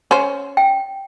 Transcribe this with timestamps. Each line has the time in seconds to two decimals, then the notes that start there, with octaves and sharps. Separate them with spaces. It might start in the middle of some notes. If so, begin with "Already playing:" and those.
0.11 C#4 C5
0.57 G5